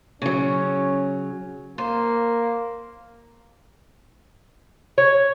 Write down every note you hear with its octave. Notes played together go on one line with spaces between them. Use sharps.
C#3 F#3 C#4
A#3 C5
C#5